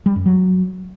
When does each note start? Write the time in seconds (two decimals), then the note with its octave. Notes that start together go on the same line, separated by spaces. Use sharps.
0.06 G3
0.16 F#2
0.26 F#3